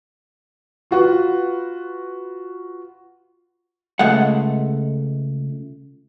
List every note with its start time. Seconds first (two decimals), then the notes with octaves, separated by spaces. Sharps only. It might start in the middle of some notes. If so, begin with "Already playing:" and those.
0.91 F4 F#4 B4
3.99 C#2 G#3 A3 F#5